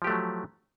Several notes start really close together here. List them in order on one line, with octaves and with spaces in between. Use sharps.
F3 G4 A3 F#3